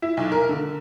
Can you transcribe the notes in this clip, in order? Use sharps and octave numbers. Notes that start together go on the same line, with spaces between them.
E4
B1
A#4
D3